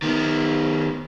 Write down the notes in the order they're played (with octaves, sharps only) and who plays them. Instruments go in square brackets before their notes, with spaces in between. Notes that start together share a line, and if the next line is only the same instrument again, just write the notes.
[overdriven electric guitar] D#3 B3